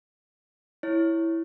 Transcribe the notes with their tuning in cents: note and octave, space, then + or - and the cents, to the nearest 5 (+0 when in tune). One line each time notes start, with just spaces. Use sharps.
E4 +0 C#5 +0